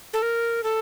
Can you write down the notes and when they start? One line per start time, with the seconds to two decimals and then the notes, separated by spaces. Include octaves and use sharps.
0.13 A4
0.22 A#4
0.63 A4